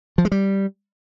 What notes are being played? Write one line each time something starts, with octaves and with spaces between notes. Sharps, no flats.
F3
G#3
G3